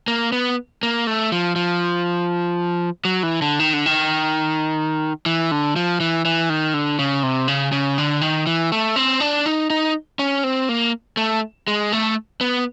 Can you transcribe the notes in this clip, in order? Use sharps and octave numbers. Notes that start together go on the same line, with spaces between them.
A#3
B3
A#3
A3
F3
F3
F#3
E3
D3
D#3
D3
D#3
E3
D3
F3
E3
E3
D#3
D3
C#3
C3
C#3
C#3
D3
D#3
E3
A3
C4
D4
D#4
D#4
C#4
C4
A#3
A3
G#3
A3
B3